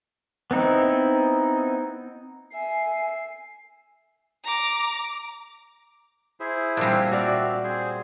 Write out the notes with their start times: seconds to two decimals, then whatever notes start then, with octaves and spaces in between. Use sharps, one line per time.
0.51 B3 C4 D#4 E4
2.54 E5 G#5 C7
4.43 A#5 D6
6.40 E4 G#4 C5
6.77 A#2 G3 C4 D4
7.12 F#4 D5 E5 F5
7.64 C4 G#4 C5